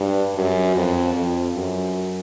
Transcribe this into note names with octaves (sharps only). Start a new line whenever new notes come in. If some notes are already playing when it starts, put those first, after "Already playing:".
Already playing: G2
F#2
F2
F2
F#2